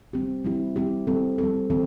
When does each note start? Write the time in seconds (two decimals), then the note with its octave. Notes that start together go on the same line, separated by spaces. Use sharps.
0.13 G3 C4 G4
0.44 G3 C4 E4 G4
0.76 G3 C4 E4 G4
1.07 G3 C4 A4
1.38 G3 C4 A4
1.70 E3 C4 A4